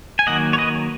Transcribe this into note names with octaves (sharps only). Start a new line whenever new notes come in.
G#5
D#3 F#3 A#3 D#5 F#5
C#5
B4 D#5